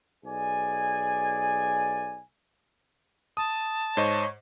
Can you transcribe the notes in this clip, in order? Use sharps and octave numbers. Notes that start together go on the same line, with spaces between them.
B1 G#4 D5 G#5
A5 D#6
G#2 C5 C#5 D#5